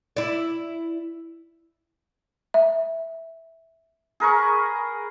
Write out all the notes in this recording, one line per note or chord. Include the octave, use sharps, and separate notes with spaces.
E4 D5
E5
G#4 A#4 B4 C#6